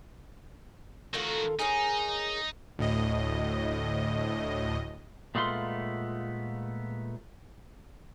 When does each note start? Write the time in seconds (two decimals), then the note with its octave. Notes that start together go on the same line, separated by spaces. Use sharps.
1.14 D#3 F4 F#4 A4 A#4
1.59 D#4 G#4 A#4 C#5
2.79 D2 A2 D#5
5.35 A#2 G#3 A3 B3 F4 C6